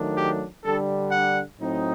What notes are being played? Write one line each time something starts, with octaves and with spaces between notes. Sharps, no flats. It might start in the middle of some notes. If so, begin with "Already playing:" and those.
Already playing: D#3 F#3 A3 D4
G4
D3 G3 D4 A4
F#5
A2 F#3 C4 D#4